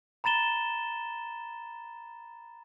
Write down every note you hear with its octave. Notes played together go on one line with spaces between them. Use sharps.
A#5 B5 A6 E7 G7